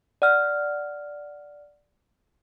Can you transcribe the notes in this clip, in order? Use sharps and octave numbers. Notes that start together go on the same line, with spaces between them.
D5 F#5 F6